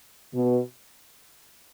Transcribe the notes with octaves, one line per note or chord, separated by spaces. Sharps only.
B2